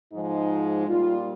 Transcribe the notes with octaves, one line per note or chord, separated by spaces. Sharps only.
G#2 F3 G#3 D#4
A#2 G3 F4